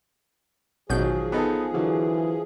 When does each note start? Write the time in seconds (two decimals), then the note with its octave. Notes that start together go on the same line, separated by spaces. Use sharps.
0.90 A1 B2 D#3 F3 F#3 G#4 G6
1.32 B3 D#4 A4
1.74 D3 E3 F#3